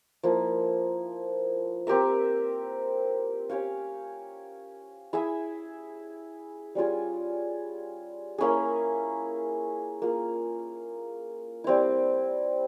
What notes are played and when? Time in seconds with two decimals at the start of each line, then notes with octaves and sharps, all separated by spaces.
0.23 F3 A#3 E4
1.87 C4 G4 A#4 E5
3.49 C#4 G4 C#5 F5
5.13 E4 G#4 E5
6.75 G3 C#4 F4 G#4
8.38 A#3 C#4 E4 G#4
10.02 A#3 F4 G#4
11.64 G3 C4 E4